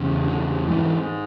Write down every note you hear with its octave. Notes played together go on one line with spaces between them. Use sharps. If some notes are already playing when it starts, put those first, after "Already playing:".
Already playing: E2 C#3
D3
G#2 E3